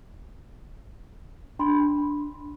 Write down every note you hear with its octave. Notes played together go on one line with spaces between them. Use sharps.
D4 B5 C6